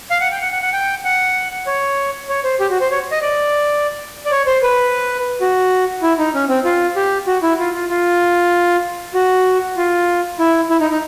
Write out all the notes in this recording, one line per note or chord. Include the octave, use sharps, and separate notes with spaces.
F5
F#5
G5
F#5
F#5
F#5
G5
F#5
C#5
C#5
C5
G4
F#4
C5
C#5
D#5
D5
D5
C#5
C5
B4
F#4
E4
D#4
C#4
C4
F4
G4
F#4
E4
F4
F4
F4
F#4
F4
E4
E4
D#4
D#4